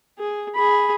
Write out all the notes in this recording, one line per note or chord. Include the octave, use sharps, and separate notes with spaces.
G#4
G#4 B5